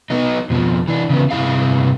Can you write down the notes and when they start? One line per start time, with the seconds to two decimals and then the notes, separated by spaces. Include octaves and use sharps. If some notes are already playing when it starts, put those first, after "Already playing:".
0.10 F#3 B3 D#4
0.50 F2 B2 F3
0.88 E3 D4
1.09 C#3 E3 B3
1.31 G2 C3 E4 G#4 F5